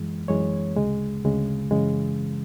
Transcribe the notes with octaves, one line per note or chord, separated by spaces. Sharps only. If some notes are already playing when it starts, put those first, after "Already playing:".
Already playing: F#2 E3 G#3
F#2 E3 G#3 C#5
D2 C#3 G#3
D2 C#3 G#3
F#2 C#3 E3 G#3